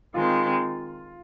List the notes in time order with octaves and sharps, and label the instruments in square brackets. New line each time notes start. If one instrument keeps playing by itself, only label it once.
[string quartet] D#3 G#3 C4 [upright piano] F4